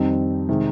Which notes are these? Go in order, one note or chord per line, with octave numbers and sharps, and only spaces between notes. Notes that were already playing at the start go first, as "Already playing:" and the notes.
Already playing: F2 D#3 G3 C4 D#4
C3 D#3 G#3